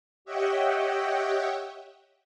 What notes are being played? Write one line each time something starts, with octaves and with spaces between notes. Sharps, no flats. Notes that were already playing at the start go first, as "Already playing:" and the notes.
G4 C#5 D#5 E5 F#5 G5